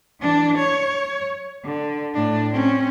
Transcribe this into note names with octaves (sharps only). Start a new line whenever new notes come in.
E3 D4
C#5
D3
A2 D4
C4 C#4